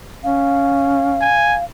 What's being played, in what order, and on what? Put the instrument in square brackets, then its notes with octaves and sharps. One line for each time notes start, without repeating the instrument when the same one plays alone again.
[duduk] C#4 [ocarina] F5
[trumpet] G#5